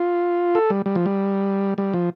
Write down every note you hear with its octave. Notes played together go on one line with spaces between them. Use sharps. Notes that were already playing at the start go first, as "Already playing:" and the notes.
Already playing: F4
A4
G3
G3
F3
G3
G3
F3